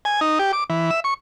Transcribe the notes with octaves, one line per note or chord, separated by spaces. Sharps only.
G#5
D#4
G4
D6
E3
E5
C#6